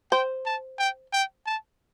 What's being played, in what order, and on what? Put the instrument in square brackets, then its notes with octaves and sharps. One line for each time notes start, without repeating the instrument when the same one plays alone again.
[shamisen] C5 [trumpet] G5
[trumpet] A5
G5
G5
A5